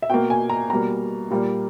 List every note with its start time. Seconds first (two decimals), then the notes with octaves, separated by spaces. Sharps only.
0.02 E5
0.10 B2 A#3 G5
0.30 G#5
0.50 A#5
0.70 B2 G3 A#3 A#5
1.30 A#2 G3 A#3